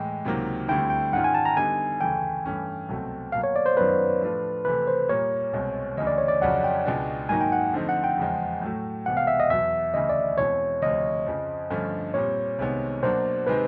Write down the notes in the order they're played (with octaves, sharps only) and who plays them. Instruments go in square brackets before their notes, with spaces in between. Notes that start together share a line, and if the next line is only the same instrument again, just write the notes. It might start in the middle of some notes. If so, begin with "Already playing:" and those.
Already playing: [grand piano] A2 E3 G#3 [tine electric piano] G5
[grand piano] C#2 C3 D#3 F#3 A#3
[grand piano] D2 D3 G3 C4 E4 [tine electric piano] G5
[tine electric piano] G5
[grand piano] G#2 D#3 G#3 C#4 F4 [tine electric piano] F#5
[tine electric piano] G#5
A5
A#5
[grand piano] D3 G3 B3 D#4 [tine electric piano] G#5
[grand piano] D2 C#3 E3 A3 [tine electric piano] G5
[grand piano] G2 E3 A3 C#4
C2 B2 F#3 A3 C4
[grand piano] B2 F#3 A#3 [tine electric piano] F5
[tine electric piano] C#5
D5
C5
[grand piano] F#2 D#3 F#3 B3 [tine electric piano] B4
[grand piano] A2 F3 A3 D4 F4
[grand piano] C3 E3 A3 [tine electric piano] B4
[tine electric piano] C5
[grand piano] A#2 G3 A#3 [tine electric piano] C#5
[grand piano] C2 B2 G#3 C4
[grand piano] D2 C#3 E3 [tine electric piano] D#5
[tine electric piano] D5
C#5
D5
[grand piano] F2 C#3 F#3 [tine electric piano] F#5
[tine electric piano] G5
[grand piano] C#2 B2 G#3 B3 D4
[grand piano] G#2 D#3 F#3 A#3 D#4 [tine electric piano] G#5
[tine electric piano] G5
F#5
[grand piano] D3 F3 A3 C4 D#4
[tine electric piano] F#5
G5
[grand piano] E2 C#3 F3 G#3
A2 F#3 A3
[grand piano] C2 C3 E3 G#3 B3 [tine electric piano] F#5
[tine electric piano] F5
E5
D#5
[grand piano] E2 B2 F#3 B3 [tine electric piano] E5
[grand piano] D2 C#3 E3 [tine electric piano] D#5
[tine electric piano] D5
[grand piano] E2 B2 G#3 C4 E4 [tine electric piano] C#5
[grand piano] D2 C3 F3 [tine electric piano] D#5
[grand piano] F2 C#3 F3
G2 D3 F3 A3 C#4
[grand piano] A#2 G3 C4 [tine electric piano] C#5
[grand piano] C2 C3 D#3 G#3 B3
[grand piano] B2 F#3 A#3 D4 [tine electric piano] C5
[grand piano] C3 D#3 G#3 C4 [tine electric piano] B4